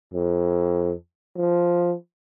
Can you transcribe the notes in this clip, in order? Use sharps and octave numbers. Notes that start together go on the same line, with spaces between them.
F2
F3